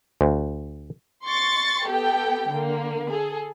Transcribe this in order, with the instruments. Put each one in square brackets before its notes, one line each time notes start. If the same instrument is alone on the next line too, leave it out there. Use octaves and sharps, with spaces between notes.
[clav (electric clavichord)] D2
[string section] C6 C#6 A6
B3 G4 A4 G5
D3 A#3
G#4 A4